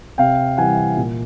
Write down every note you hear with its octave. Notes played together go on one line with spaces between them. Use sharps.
C3 F5 G5
E3 G3 F#5 G#5
A#2